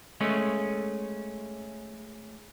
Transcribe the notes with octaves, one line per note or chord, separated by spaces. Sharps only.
G#3 A3 C#4